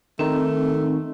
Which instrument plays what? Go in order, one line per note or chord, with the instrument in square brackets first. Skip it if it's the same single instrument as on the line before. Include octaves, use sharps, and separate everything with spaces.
[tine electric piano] D#3 D#4 [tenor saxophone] A3 [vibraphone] C4